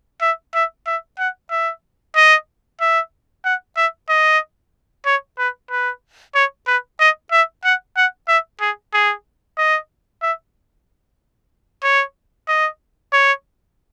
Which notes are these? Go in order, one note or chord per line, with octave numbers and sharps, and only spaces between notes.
E5
E5
E5
F#5
E5
D#5
E5
F#5
E5
D#5
C#5
B4
B4
C#5
B4
D#5
E5
F#5
F#5
E5
G#4
G#4
D#5
E5
C#5
D#5
C#5